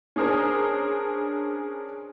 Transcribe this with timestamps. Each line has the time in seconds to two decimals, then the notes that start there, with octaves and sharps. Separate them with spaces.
0.16 C#4 D4 G#4 A#4 C5